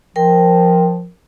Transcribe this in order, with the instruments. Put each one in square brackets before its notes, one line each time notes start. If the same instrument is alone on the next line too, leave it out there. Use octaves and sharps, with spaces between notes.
[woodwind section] F3 [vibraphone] A#4 G5